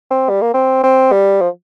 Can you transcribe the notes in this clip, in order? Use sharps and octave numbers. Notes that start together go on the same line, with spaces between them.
C4
G3
A#3
C4
C4
G3
F3